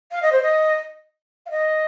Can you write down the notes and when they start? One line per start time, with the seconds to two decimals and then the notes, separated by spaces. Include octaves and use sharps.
0.12 F5
0.22 D#5
0.32 C5
0.42 D#5
1.46 F5
1.51 D#5